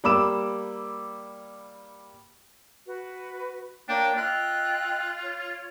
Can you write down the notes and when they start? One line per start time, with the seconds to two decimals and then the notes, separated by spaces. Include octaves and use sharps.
0.04 G3 A#3 B5 D6 E6 E7
2.87 F#4 B4
3.89 A#3 D4 A#4 C#5 D5 G5
4.17 F4 D#5 G5 E6 F#6
5.23 C#5